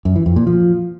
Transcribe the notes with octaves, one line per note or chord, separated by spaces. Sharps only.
F#2
E3
F2
A#2
F3